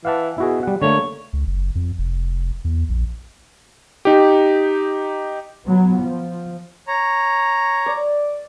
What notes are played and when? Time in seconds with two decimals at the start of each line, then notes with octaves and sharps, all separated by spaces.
0.05 E3 F5 F#5 A5
0.38 B2 E4 F#4 G#4
0.63 G3 F#5
0.82 D3 A3 A#3 C#5
1.33 C#2
1.47 F#1
1.75 F2
1.99 F1
2.64 E2
2.89 A#1
4.05 D#4 G4
5.66 F#3 B3
6.00 F3
6.88 C#5 A#5
7.86 D5